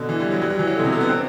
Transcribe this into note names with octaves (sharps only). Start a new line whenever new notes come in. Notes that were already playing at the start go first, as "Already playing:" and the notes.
Already playing: B2 D3
E3
G3
F#3
G3
F#3
E3
F#3
B2 D3
C3
D3
B3
C4